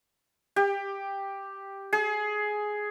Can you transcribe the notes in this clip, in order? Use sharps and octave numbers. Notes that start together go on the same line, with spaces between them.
G4
G#4